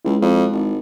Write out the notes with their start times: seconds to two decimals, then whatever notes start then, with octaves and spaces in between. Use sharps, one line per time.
0.05 C#2 G#3 E4
0.22 F2
0.53 G#1